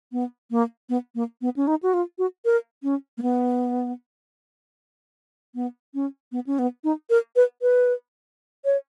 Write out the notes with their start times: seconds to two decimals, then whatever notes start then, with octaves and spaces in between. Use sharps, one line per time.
0.12 B3
0.51 A#3
0.89 B3
1.15 A#3
1.42 B3
1.56 C#4
1.67 D#4
1.83 F#4
1.94 F4
2.18 F#4
2.45 A#4
2.83 C#4
3.18 A#3
3.22 B3
5.55 B3
5.94 C#4
6.32 B3
6.47 C#4
6.59 B3
6.84 D#4
7.10 A#4
7.36 B4
7.62 B4
8.65 C#5